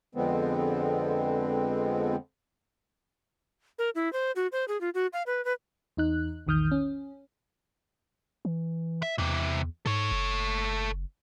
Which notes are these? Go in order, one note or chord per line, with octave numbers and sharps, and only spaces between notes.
F2 D3 F3 G#3 B3 C4
A#4
E4
C5
F#4
C5
G#4
F4
F#4
F5
B4
B4
E2 D#4 F#6
A#1 E2 D#3 D#6 F6 G6
C#4
E3
E5
E2 C3 E3
G#2 A4 C#5
F#1